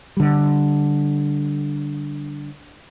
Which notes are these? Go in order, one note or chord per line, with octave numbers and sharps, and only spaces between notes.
D3 G3